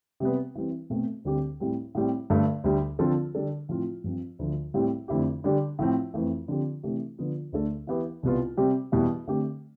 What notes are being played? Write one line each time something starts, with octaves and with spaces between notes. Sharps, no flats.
C3 G3 B3
E3 G3 C4
B2 A3 C4
D2 D3 G3 C4 G4
A2 G3 C4
A2 G3 C4
G2 D3 A3
D2 D3 G3
D3 F3 C4 F4 A4
D3 G3 D4 A4
A2 F3 C4 F4
G2 F3 C4
D2 D3 F3
A2 G3 C4 G4
F2 D3 A3 E4 G4
D3 G3 D4 G4
A2 F3 C4
F2 E3 A3
D3 F3 C4 G4
C3 E3 A3 D4 G4
D3 F3 B3 F4
D2 D3 A3 D4 A4
E3 B3 E4 G4
C2 B2 G3 B3 F4
C3 G3 C4 G4
E2 B2 G3 B3 E4
D3 A3 C4 G4